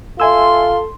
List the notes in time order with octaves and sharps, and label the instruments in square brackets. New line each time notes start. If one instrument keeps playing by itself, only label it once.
[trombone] F4 [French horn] A4 [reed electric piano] E5 G#5 E6 [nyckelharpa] C6